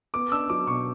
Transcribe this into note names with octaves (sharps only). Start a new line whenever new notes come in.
B3 D6
D4 E6
F#3 D6
B2 C#6